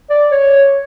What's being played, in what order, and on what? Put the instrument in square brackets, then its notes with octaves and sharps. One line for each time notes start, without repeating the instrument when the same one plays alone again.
[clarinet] D5
C#5